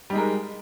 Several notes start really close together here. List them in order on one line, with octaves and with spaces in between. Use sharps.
G3 D#4 G#3 A#4